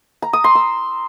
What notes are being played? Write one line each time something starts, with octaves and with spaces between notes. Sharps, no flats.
A#5
D#6
C6
E6